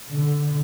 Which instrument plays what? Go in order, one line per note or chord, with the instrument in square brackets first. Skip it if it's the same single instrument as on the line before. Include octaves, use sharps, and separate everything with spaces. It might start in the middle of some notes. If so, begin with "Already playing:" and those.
[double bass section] D3